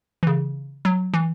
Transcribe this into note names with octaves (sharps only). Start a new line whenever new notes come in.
E3
C#3
F#3
E3